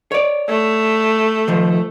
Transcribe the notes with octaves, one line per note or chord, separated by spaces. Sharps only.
C#5 D5
A3
D#3 F3